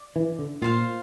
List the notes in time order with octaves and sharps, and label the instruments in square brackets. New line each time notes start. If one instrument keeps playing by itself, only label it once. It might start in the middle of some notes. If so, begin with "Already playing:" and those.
Already playing: [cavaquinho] D5
[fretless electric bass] E3
D3
[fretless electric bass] A#2 [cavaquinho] F4 C5 F5